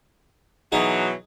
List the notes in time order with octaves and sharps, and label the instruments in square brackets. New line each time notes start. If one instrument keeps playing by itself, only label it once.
[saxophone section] B2 E3 F#3 [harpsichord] D#4 G#4